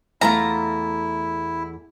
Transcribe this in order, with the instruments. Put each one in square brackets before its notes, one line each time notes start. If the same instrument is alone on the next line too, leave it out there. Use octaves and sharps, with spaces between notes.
[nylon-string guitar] E2 A3 F4 [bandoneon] E4 [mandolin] A#5